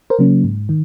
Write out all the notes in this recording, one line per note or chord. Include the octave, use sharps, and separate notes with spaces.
A#4 C5
C#3 F#3 A#3 C#4
G#2
D#3